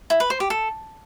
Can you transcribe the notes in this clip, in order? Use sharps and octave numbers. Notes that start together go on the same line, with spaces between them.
E4
B4
C5
G4
A4